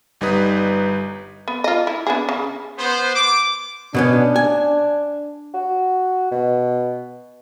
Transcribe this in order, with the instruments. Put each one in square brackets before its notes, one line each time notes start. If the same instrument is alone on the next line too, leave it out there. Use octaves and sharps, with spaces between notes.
[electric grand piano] G1 G3 D#4 B4 D#6
[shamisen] B3
F4 D#5
E4
B3 D4 G#4
C#3
[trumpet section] B3 C5
D6
[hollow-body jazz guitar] B2 B3 C#4 [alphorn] D4
[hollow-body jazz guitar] G#5
[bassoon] F#4
B2